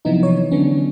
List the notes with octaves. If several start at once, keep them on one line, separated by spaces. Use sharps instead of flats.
C3 F3 F#3 B3 D#4 E4
E3 C#5
D3 F#3 B3 C#4 D4